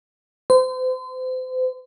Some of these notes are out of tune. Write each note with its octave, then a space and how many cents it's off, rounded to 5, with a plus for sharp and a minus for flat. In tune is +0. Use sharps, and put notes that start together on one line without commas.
C5 -35